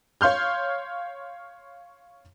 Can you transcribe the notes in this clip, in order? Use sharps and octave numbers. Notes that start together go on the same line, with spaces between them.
C#5 F5 C6 F6 G6